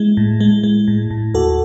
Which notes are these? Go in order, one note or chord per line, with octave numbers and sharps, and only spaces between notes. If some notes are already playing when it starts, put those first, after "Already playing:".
Already playing: G#3 E4
A2
G#3
G#3
A2
A2
D#2 F#4 A4